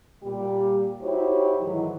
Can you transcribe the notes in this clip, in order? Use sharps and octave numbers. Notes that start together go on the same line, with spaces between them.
A#2 G3 G4
D#4 E4 F#4 G4 C5 C#5
G#2 D#3 E3 F#3